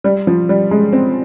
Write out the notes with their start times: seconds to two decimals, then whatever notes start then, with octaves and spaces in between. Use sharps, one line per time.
0.04 G3
0.27 F3
0.49 G3
0.71 G#3
0.93 C4